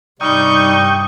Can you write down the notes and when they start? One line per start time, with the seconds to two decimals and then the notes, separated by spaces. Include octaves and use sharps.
0.21 G2 C3 G3 D#4 G5 C#6 D#6 G6